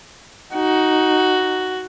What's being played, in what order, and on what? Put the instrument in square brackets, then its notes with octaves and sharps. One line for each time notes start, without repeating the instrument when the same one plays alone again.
[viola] D#4 [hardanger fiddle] F#4